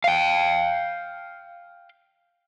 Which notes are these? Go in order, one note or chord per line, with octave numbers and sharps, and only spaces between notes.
F5 G5